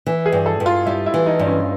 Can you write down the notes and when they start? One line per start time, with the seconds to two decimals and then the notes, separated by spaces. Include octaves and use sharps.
0.06 E3
0.26 G#4
0.32 G2
0.46 A4
0.60 G2
0.66 F4
0.86 G3 E4
1.06 E4
1.14 E3
1.26 D#4
1.39 G2
1.47 C#4